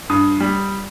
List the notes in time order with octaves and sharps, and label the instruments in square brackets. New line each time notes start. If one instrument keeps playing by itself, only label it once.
[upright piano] G2 D#6
G3